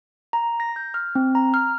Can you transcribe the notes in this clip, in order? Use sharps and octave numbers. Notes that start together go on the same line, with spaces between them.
A#5
A#6
G6
F6
C4
A#5
F6